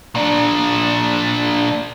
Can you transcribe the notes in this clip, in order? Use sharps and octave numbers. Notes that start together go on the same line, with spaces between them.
A#2 D4